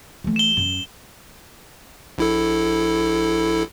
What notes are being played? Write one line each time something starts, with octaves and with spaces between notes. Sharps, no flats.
E3 A3
E7 G7
F#2
A#1 E4 A4